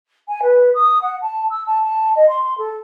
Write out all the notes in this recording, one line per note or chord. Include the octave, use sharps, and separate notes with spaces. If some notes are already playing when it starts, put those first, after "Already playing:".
G#5
B4
D#6
F#5
A5
E6
A5
A5
D#5
C6
C6
A4